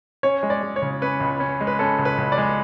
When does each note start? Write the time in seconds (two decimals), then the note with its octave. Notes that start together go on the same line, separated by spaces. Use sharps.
0.23 C#4 C#5
0.43 G#3
0.50 D5
0.63 G#3
0.76 C#5
0.82 C#3
1.02 C#4 B4
1.21 C#2
1.40 C#4
1.61 G#3
1.67 B4
1.79 C#4 A4
1.99 C#2
2.05 B4
2.18 C#2
2.32 D5
2.38 G#3